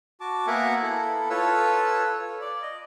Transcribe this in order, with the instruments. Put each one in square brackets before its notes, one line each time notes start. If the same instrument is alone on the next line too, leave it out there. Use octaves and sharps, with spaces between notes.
[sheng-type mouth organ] F#4 A5 D6
A#3 B3 A#4 E5 F#5 G#5
E4 A4
F4 A4 B4 C#5 E6
D5
D#5